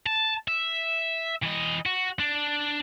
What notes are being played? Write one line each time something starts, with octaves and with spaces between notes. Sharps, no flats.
A5
E5
E3 D#5
F#4
D4